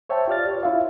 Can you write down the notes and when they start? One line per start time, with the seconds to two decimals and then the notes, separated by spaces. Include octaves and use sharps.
0.09 C5 C#5 E5 G5 A5
0.28 F4 G4 D5 F6 A6
0.48 B4 C#5
0.63 E4 F4 E5 F5